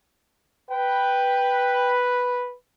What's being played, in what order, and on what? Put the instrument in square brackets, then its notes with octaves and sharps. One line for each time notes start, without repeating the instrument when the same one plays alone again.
[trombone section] B4 [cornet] G5